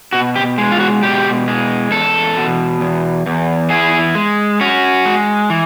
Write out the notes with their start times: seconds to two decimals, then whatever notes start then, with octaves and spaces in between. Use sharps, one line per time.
0.13 B2 F#4
0.36 G4
0.58 G#3
0.72 F4
0.80 F#4
1.03 B2 G4
1.48 G#3
1.91 E2 A4
2.37 B2
2.81 E2
3.26 E2
3.70 E4 G#4
4.15 G#3
4.61 C#4 F#4
5.05 G#3
5.50 E3